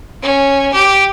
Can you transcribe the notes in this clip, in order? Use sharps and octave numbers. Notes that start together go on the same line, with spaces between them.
C#4
G4